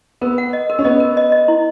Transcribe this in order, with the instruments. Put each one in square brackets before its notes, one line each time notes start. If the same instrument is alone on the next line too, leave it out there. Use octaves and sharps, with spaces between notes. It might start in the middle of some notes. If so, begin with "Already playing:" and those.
[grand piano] B3 [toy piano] A#4
[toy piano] F#5
D#5
A#4
[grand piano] C#4
[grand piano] B3 [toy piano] D#5
[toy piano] A#4
D#5
D#5
E4